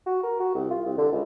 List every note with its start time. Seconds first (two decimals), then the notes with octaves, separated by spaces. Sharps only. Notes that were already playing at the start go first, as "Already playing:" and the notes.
0.06 F#4
0.23 A#4
0.40 F#4
0.55 C2
0.71 F4
0.86 C2
0.98 D3
1.11 C#2